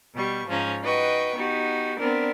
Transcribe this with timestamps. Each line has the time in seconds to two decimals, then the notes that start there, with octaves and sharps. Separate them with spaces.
0.15 B2 G3 C#6
0.48 G#2 F3 C#4 A#5
0.82 D#4 F#4 B4 D#5 G5 C#6
1.36 B3 D#4 F#4 G4
1.99 B3 C4 D4 A#4